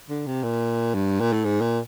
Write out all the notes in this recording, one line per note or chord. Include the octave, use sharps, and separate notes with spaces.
D3
C3
A#2
G2
A#2
A2
G#2
A#2